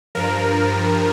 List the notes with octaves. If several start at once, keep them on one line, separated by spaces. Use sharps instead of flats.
G2 F3 A#4